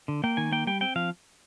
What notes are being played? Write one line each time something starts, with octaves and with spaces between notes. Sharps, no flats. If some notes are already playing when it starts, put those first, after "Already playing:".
D3
A#3 G5
D#3 G#5
A#3 G5
G3 G5
C4 G5
F3 F5